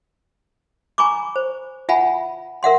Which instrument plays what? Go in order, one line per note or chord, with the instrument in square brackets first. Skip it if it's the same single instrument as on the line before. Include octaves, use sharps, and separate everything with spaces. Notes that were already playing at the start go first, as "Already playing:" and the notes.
[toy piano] G#5 A#5 B5 C#6 D6
C5
F4 E5 F#5 G#5 A5 B5
A#4 E5 F#5 C6